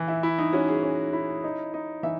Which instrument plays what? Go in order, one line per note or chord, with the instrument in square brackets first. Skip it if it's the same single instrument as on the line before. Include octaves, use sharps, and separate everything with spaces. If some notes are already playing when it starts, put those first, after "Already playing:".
Already playing: [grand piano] E3
[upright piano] E4
[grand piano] E4
[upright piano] D#4
[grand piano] C#4 [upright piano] F#4
[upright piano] G#4
[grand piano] C#4
E4
D#4
D#4
[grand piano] E3 [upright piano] E5